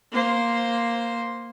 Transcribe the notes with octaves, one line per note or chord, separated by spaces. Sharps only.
A#3 C5